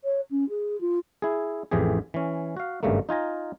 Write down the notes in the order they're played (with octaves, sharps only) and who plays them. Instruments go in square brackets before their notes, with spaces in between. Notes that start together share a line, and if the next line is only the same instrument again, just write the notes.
[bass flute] C#5
C#4
G#4
F4
[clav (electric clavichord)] E4 G#4
A1 F2 A2 E3 G4 G#4
E3 C#4
F#4 F5
G#1 G2 C#3 A3 A#3
D#4 F4 G#5 A#5